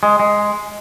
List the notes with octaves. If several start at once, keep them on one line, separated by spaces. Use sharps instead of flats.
G#3
G#3